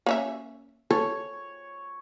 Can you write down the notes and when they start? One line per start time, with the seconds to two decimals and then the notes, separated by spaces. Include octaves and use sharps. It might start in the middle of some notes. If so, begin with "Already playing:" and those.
0.06 A#3 C#4 E5
0.91 A4 C#5